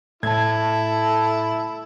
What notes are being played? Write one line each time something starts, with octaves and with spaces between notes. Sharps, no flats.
A2 E4 A4 A5 G#6